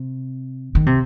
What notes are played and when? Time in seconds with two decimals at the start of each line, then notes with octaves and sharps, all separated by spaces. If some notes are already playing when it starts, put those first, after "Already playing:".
Already playing: C3
0.75 D#3
0.86 C3